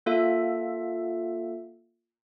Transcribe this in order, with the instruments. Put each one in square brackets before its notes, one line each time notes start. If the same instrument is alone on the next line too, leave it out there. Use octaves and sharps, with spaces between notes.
[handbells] A#3 F4 A4 E5